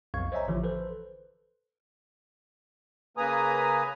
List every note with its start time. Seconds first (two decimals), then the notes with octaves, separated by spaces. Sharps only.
0.14 B1 F2 F5 C#6 G#6
0.32 C5 C#5 D#5 E5 G#5 A#5
0.48 A1 D3 E3 F3
0.64 A4 B4 C5
3.17 C#3 A#3 B4 G#5 A#5 D#6